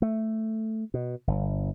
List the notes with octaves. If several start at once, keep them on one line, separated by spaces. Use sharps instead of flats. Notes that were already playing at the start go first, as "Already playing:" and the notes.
A3
B2
G1